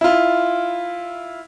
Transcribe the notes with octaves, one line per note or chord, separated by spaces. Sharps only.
E4 F4